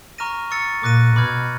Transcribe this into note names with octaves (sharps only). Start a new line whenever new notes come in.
A#5 C#6 F6 A#6 D#7
C#6 E6 A6 C#7
A#2 D6 F#6 A#6 D#7
B2 B5 D6 F6 G#6